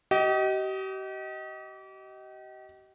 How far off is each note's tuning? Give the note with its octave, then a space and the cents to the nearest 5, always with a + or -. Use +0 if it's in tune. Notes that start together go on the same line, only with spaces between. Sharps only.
G4 -40 D#5 +15